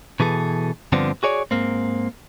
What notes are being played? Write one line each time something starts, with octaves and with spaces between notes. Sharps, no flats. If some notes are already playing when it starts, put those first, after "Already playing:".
B2 E3 G#4 A4
G2 D3 F3 B3 C4 D4
F#4 G#4 C#5 D5
G#2 A#3 C4